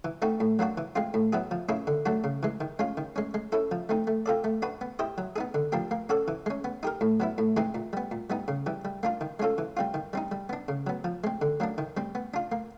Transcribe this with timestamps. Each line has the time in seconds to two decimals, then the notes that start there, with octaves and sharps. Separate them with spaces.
0.05 E3
0.22 A3 C4 D#4 F#4
0.40 A2
0.59 F#3 A#3 D4 F#4
0.78 E3
0.96 G#3 C4 F4
1.14 A2
1.33 F#3 B3 E4 G#4
1.51 F3
1.69 A#3 C#4 E4 G#4
1.87 D3
2.06 F#3 A3 D4 F#4
2.24 C#3
2.43 E3 G#3
2.61 D#3
2.79 G#3 C#4 F4
2.97 D#3
3.16 G#3 C#4
3.34 G#3
3.52 C#4 E4 A4
3.71 F3
3.89 A3 C4 D#4
4.07 A3
4.26 C4 F4 A4 D5
4.44 A3
4.62 D4 F#4 B4
4.81 B3
4.99 E4 G4 C5 D#5
5.18 F#3
5.36 B3 D#4 G#4
5.54 D3
5.72 F3 A#3 D4 G4
5.91 A#3
6.09 C#4 F#4 A4 D5
6.28 E3
6.46 G#3 C#4
6.64 B3
6.83 D#4 G4 A#4
7.01 A2
7.20 F#3 B3 E4
7.38 A2
7.57 E3 G#3 C4 D#4
7.75 A#2
7.93 G3 B3
8.11 A#2
8.30 G3 B3 D#4
8.48 C#3
8.66 E3 G3
8.85 G3
9.03 A#3 D4 F4
9.21 D#3
9.40 G#3 C#4 F4 A4
9.58 E3
9.77 G3 C4 F4
9.94 D#3
10.13 G3 C4 D#4
10.31 G3
10.49 B3 D4
10.68 C#3
10.87 F#3 B3
11.04 F3
11.24 G#3 C4
11.42 D3
11.60 F#3 A#3 D4
11.78 D#3
11.97 G3 C4
12.15 B3
12.34 D4 F4
12.52 A#3